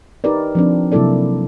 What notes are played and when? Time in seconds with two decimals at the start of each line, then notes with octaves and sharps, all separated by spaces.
0.24 D#4 G4 A#4 B4 D5
0.55 F3 C4 D4
0.92 C3 F#3 A#3 E4 A4 D5